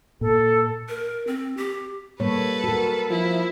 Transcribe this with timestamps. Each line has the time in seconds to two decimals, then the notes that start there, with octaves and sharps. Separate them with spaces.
0.21 A#2 A4
0.88 A#4
1.27 C4
1.57 G4
2.20 G3 A#3 A4 B4 C#5
2.64 F#4 A#4
3.10 F3 E4